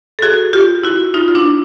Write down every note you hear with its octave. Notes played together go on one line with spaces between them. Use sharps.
A4
F#4 G#4
F4 G4
E4 F#4
D#4 F4
F4
D4 E4